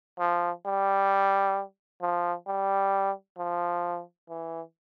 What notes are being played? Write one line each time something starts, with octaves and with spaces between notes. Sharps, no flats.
F3
G3
F3
G3
F3
E3